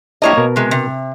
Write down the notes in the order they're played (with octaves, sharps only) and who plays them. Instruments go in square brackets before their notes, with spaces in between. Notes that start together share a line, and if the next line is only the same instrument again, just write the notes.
[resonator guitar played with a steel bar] A#3 C#5 D#5 [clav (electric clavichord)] D4 E4 G4
[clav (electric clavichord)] B2 A#4
[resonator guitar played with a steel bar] C3 G#3
C3